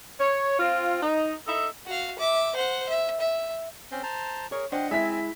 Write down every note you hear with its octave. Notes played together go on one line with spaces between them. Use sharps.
C#5
C4 F4
D#4
D#4 A4 E5
F#4 F5
E5 D6
C5 F#5
E5
E5
C4 C#4 C5
C5 A5 A#5
G#4 A#4 C#5
D4 C5 D#5 F#5 G5
G#3 C4 E4 E5 G#5 B6